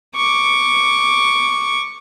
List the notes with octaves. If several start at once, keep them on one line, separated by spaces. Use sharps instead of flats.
C#6 D6